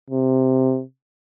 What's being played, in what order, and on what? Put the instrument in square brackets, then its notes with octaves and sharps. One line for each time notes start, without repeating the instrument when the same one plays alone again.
[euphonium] C3